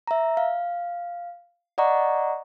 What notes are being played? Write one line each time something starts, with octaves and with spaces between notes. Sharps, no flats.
E5 A#5
F5
D5 D#5 F#5 A#5 C#6